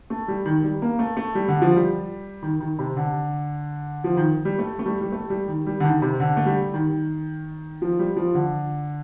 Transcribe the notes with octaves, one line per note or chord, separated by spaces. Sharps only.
A3
G3
D#3
G3
A#3
A3
A3
G3
D3
F3
G3
D#3
D#3
C3
D3
F3
D#3
G3
A3
A3
G3
G3
A3
G3
D#3
G3
D3
D#3
C3
D3
A3
G3
D#3
F3
G3
F3
D3